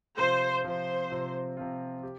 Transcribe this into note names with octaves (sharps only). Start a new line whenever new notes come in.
C3 F3 C4 F4 C5
C3 F3 C4 F4 C5
C3 F3 C4 F4
C3 F3 C4 F4
G4